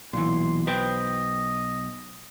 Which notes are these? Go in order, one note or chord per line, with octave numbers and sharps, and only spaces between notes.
B1 A#2 E3 C6
B4 C5 D#5 G5